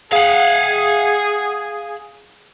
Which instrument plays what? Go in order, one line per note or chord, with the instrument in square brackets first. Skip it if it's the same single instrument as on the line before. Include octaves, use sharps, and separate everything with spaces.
[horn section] G#4 [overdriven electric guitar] F5 F#5